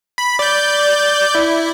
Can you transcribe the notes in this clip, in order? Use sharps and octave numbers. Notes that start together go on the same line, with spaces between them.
B5
D5 G6
E4